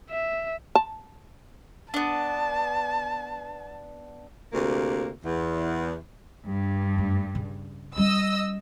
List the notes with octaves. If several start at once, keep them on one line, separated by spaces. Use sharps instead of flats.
E5
A5
B3 D4 A5
D2 C3 A#3
E2
G2
F#2 A3
C#3
G3 C#4 D#5 E6